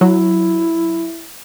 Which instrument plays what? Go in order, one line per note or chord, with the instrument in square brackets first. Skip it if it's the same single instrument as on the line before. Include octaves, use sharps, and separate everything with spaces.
[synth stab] F#3 [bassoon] E4